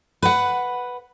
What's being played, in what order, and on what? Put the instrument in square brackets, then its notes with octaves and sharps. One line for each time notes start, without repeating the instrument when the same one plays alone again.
[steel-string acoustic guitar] B4 F#5